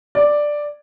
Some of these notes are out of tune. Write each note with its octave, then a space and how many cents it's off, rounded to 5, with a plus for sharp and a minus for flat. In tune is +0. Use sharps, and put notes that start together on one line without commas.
D5 +5